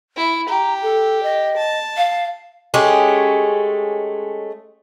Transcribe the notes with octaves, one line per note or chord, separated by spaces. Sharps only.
E4
G4 A#5
A4
D#5
A5
F5
G#3 A3 C#4 G4